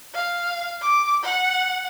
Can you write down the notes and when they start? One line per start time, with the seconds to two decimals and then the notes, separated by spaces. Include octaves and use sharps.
0.14 F5
0.81 D6
1.23 F#5